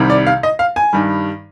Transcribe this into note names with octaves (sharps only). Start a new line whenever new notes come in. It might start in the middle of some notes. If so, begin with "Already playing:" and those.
Already playing: C2 C3 D#3 G3
D5
F5
D#5
F5
G#5
G2 D#3 G3